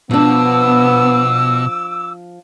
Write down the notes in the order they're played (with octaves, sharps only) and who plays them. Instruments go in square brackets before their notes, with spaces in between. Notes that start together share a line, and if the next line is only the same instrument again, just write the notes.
[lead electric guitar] B2 [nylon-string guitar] F3 D4 [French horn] B3 [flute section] D6 E6